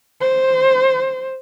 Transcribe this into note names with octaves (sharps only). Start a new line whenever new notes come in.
C5